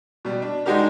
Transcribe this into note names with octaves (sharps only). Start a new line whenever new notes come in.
B2 G3
D4
G#3 D4 D#4 F#4 G4 A#4